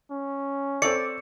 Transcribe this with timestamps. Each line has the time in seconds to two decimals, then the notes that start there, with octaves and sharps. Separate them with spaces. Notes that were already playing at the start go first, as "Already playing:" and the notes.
0.11 C#4
0.82 C4 A4 C#5 D5 C#7